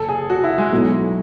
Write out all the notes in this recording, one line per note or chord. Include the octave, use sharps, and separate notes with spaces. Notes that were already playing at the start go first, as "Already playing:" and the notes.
Already playing: F#1 A4
G#4
F#4
E4
G#3
B1 B2 F#3 A3 E4